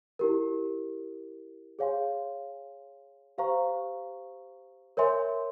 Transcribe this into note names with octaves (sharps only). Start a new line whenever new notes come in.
E4 G4 A#4
G#4 C#5 F5 G#5 C6
G4 C5 F5 A#5 C#6
A#4 C#5 E5 G#5 C6